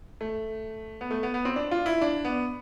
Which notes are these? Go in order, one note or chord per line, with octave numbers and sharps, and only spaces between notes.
A3
B3
A3
B3
B3
C4
D4
F4
E4
D4
B3